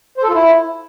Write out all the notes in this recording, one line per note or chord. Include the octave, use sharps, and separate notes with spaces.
C5
A4
F4
E4